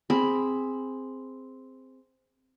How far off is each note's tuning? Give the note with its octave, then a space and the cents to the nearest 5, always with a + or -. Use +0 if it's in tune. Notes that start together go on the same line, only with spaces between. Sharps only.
C4 -5 G#4 -5 B5 +0